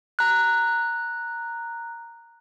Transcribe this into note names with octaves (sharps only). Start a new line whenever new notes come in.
A#5 F#6